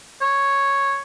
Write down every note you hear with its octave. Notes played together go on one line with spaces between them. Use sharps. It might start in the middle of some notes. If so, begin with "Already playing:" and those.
C#5